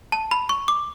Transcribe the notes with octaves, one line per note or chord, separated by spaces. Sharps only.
A5
B5
C#6
D6